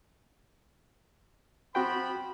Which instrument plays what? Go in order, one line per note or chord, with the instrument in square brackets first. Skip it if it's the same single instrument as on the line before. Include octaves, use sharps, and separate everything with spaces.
[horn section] F3 C5 B5 [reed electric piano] C4 F#4 G5